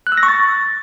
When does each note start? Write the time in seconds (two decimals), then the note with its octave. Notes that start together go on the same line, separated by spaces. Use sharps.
0.07 F#6
0.12 E6
0.17 A#6
0.23 C#6
0.28 A6